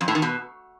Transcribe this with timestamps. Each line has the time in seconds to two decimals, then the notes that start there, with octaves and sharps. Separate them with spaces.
0.01 F2
0.08 A2
0.15 D#3
0.22 B2